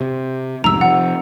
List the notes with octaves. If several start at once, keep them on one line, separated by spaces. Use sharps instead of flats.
C3
C2 F2 G#2 A#5 E6
C3 E3 F3 F#5